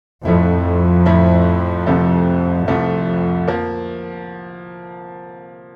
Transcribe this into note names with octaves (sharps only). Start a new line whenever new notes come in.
F2 A2 F3 A3 E4
A2 F3 A3 E4
C2 C3 F3 A3
C2 F2 C3 F3 A3
F3 A#3